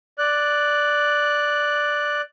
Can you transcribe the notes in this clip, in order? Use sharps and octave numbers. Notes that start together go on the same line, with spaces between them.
D5 F#6